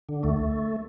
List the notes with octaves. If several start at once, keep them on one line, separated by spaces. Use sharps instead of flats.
D3
D2 A3